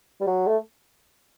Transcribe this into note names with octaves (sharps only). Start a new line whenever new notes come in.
G3
F#3
A3